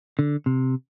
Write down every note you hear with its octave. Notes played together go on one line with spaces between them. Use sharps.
D3
C3